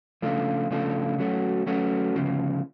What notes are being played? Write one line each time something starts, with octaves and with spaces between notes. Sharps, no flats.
C#3 F3 A3 D4 F4
C#3 F3 A3 D4 F4
F#3 A3 C#4 F#4
F#3 A3 C#4 F#4
D2 C#3 F3